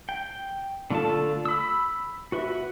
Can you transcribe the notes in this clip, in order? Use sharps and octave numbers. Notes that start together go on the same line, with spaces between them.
G5
D3 A3 F4 A4 A5
B5 E6
F#4 B4 E5